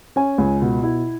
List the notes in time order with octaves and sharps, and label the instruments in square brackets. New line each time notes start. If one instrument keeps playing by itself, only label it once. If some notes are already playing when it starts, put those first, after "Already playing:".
[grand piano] C#4 G#5
C#2
B2
E4